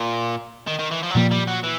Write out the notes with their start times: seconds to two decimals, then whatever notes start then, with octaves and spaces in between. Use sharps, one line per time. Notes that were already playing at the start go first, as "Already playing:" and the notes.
Already playing: A#2
0.67 D#3
0.79 D#3
0.92 E3
1.03 F3
1.11 F#3
1.15 A#2 F3 G3 A#3
1.31 G3
1.48 F#3
1.64 E3